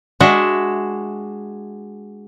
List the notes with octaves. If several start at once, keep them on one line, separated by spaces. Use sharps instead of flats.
G#3 D4 F#4 E5